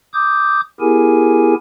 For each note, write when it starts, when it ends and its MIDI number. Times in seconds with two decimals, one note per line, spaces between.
0.14 0.61 86
0.14 0.61 87
0.14 0.61 91
0.80 1.54 59
0.80 1.54 64
0.80 1.54 67
0.80 1.54 68
0.80 1.54 70
0.80 1.54 80